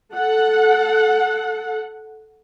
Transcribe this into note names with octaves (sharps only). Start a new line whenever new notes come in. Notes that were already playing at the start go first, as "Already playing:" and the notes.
A4 F#5